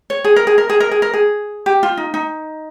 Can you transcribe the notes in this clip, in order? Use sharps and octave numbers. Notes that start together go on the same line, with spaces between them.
C#5
G#4
A#4
G#4
A#4
G#4
A#4
G#4
A#4
G#4
G4
F4
D#4
D#4